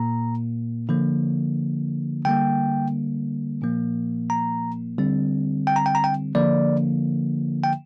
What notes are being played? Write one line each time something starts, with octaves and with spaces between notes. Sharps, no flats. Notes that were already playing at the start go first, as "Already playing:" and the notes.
Already playing: A#2 A#3 A#5
D3 F3 A#3
D3 G3 A#3 G5
A#2 F3 A#3
A#5
D3 G3 C4
G5
A#5
G5
A#5
G5
D3 F3 A#3 D5
G5